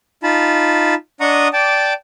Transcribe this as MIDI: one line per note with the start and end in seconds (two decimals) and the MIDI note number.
0.23 0.95 63
0.23 0.95 65
0.23 0.95 81
0.23 0.95 83
1.21 1.48 62
1.21 1.48 75
1.21 1.48 78
1.21 1.48 82
1.21 1.48 85
1.21 1.48 87
1.53 1.93 74
1.53 1.93 79
1.53 1.93 81
1.53 1.93 86